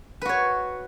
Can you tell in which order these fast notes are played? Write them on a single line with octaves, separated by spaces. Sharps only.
B4 F#4 C#5